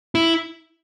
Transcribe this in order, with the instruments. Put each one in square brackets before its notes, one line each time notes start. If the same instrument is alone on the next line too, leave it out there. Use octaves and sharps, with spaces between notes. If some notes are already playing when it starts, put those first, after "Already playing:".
[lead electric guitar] E4